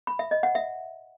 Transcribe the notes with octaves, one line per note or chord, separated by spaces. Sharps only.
B5
E5
D#5
F#5
E5